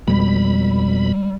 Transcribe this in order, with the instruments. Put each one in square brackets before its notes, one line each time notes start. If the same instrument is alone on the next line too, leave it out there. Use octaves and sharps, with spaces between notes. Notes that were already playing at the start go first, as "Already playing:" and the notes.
[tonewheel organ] F2 B2 B5 [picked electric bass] G3 G#3